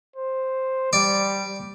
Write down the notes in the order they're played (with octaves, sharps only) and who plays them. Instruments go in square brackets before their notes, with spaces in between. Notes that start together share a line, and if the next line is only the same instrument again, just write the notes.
[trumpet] C5
[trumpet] G3 [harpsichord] D5